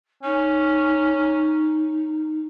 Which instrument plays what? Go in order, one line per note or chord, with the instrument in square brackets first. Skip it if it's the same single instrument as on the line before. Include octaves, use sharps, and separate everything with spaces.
[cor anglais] C#4 [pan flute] D#4